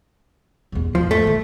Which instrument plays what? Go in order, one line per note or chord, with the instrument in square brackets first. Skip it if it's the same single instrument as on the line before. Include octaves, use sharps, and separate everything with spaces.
[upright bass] A1 E2
[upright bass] E2 G#2 [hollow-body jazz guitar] F3
[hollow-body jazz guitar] A3
[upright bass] D#3 G3